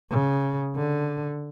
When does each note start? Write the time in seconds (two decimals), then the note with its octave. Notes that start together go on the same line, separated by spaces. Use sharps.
0.11 C#3
0.76 D3